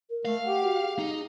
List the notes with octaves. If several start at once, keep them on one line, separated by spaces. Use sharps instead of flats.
A#4
A3 F5
G4 F#5
F#4
G#4
D#4